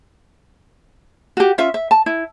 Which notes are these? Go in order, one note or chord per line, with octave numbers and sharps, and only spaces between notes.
F#4 G4
C#4 F4 E5
E5
A5
E4